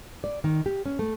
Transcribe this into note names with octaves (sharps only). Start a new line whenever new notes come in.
D5
D#3
G4
C#4
A3